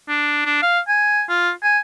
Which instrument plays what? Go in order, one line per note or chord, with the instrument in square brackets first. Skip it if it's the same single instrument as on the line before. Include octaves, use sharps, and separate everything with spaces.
[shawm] D4
D4
F5
G#5
F4
G#5